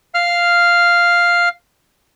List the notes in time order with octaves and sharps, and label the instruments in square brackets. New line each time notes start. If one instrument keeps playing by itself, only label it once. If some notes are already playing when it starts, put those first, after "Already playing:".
[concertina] F5 F6